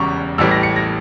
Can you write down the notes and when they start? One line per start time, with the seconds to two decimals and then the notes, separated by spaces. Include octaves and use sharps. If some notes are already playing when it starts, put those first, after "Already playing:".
Already playing: E1 E2 C#3 G3 A#5 C#6
0.38 A1 A2 E3 G3 E6
0.51 A#6
0.63 C#7
0.76 A#6